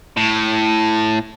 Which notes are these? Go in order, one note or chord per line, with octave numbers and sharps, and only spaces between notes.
A2